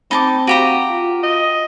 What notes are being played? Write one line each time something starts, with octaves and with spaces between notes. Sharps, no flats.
C4 D#4 A5 B5 D6
F#4 G4 F5 A#5 D7 D#7
F4
D#5